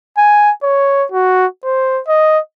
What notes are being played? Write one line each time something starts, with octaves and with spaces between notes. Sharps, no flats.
G#5
C#5
F#4
C5
D#5